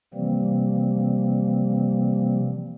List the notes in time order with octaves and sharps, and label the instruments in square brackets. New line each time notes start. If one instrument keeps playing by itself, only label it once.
[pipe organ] C3 E3 F3 G3 A#3 C4